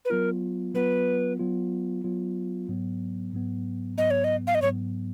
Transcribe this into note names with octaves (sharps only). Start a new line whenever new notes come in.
B4
F#3 B3 F4 A#4
F#3 B3 F4 B4
F#3 B3 F4
F#3 B3 F4
G#2 F#3 B3
G#2 F#3 B3
G#2 F#3 B3 D#5
C#5
D#5
F5
D#5
G#2 F#3 B3 C#5